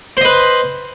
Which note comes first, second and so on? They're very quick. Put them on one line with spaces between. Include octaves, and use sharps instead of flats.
C5 D#5 B4